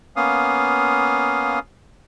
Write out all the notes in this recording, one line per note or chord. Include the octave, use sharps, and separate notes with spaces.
A#3 B3 C#4 F5 D#6